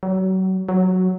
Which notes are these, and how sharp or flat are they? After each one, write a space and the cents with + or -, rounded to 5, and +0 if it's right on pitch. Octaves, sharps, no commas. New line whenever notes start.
F#3 +30
F#3 +0